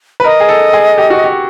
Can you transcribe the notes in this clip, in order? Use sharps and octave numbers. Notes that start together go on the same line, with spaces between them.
B4
A#4 D#5
G#4
A4
G#4
G4
F#4
G4